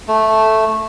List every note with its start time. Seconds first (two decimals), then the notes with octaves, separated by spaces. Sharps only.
0.08 A3